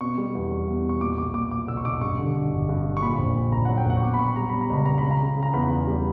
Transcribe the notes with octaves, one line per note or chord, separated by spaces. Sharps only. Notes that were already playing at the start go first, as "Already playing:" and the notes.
B2 C#6
G3
E2
G3
E2
B2
C#6
A#2 D6
B1 D6
A#2 D6
A#2 D6
B1 E6
C#6
B1 D6
G2 C#6
D3
D3
G1
G2
D3
C#6
A#2 B5
A#1
A#2
A#1 A#5
F#3 F#5
G5
A#1 F#5
C#6
B2 D6
B5
B2 C#6
G3 A#5
B2 B5
A#5
C#2 B5
C#2 A#5
C#3 B5
A#5
C#3
C#3
A#5
E2 B5
E2
G3